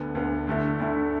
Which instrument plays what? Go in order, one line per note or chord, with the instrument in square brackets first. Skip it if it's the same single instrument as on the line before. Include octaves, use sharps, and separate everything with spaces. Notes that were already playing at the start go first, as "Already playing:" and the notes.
Already playing: [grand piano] D2 D3 B3
D2 D3 B3
D2 D3 A3 E4
D2 D3 A3 E4